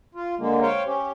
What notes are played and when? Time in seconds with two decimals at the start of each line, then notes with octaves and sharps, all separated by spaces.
0.15 F4
0.39 D3 G#3 A#3
0.62 C5 C#5 F5 G5
0.87 C#4 G4